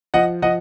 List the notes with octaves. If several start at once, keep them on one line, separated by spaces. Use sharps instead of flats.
F3 D#5 F#5
F3 D#5 F#5